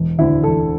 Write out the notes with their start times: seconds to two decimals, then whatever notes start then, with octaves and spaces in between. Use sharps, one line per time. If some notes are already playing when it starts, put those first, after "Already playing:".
Already playing: E1
0.18 D2 E4
0.21 D3
0.44 E1 A4